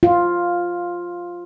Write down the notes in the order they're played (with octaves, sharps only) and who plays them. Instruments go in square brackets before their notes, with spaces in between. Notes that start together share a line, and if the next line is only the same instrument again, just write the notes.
[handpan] F4